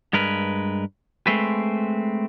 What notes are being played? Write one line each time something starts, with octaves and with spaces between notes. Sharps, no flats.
G2 G#3 A#4 B4
G#3 A3 C4 B4